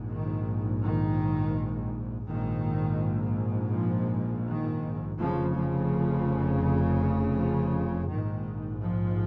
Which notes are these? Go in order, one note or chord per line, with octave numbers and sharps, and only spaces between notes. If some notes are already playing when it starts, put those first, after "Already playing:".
Already playing: A#1 G#2
D#3
D#3
A#1 G#2 D#3
F3
D#3
F1 F2 C#3 F3
F3
F3
A#1 G#2 D#3
F3